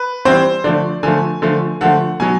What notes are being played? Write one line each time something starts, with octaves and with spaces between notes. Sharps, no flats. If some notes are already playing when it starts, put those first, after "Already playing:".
Already playing: B4
E3 G3 C4 C5
D3 F3 A3 D5
D3 F3 A3 G#5
D3 F3 A3
D3 F3 A3 F#5
B2 F#3 B3 G#5